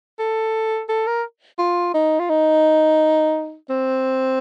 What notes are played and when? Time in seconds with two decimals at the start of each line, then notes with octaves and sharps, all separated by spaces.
0.19 A4
0.89 A4
1.07 A#4
1.59 F4
1.94 D#4
2.19 F4
2.30 D#4
3.70 C4